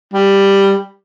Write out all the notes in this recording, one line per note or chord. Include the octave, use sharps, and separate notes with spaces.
G3